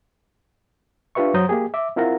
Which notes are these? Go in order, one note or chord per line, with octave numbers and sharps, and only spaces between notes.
D4 F4 G4 B4 E5 C#6
F#2 F#3 C5 A#5 D#6 G6
A#3 G4 G#4
E5 D6
C4 E4 F4 A#4 F#5 A#5